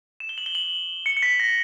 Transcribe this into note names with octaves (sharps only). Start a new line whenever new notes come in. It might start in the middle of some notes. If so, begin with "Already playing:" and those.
E7
G7
F#7
G7
F#7
C#7
C#7
B6
A#6